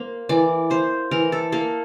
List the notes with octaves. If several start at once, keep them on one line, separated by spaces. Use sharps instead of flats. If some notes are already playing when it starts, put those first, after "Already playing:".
Already playing: A#3 C5
E3 D5
A#3 C5
E3 A#4
A4
A#3 A4